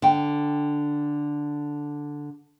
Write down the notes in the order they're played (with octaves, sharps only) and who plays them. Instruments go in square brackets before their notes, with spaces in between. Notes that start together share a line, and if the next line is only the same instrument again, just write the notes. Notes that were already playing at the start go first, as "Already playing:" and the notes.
[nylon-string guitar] D3 G5